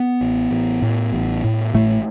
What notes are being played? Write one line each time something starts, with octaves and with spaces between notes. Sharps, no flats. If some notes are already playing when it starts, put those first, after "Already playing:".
Already playing: B3
A1
A1
A2
A1
A2
A1 A2 A3